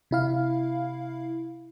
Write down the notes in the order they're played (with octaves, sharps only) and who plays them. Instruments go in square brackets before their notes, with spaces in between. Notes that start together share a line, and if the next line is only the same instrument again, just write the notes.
[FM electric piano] C3 E4 F5